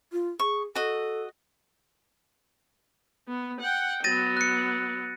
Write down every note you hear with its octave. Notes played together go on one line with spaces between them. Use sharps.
F4
G#4 C#6
F#4 A4 D#5
B3
F#5 G5
F#3 B3 A6 A#6 D#7
F#6 C#7